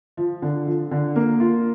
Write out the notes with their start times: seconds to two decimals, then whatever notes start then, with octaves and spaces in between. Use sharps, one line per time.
0.17 F3
0.42 D3
0.67 F3
0.91 D3
1.16 A#3
1.40 F4